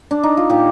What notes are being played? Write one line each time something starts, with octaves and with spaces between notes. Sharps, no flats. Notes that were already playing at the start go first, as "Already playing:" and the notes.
Already playing: C4
D4
D#4
F4
A#2 D#4 G4